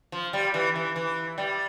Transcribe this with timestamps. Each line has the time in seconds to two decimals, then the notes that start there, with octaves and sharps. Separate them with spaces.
0.12 F3
0.33 G3
0.54 E3
0.75 E3
0.96 E3
1.38 G3